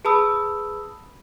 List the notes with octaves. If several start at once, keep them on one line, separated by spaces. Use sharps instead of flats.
G#4 B4 A5 B5 D#6 E6